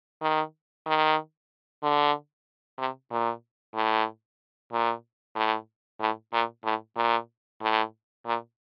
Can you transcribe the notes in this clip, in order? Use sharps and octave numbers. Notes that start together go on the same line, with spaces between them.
D#3
D#3
D3
C3
A#2
A2
A#2
A2
A2
A#2
A2
A#2
A2
A#2